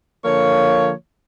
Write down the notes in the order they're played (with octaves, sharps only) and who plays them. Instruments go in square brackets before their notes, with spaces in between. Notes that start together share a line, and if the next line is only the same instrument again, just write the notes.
[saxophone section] D3 F3 A#3 C#5